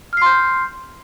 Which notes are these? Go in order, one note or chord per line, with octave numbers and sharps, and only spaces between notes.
C6 F6 G6 C7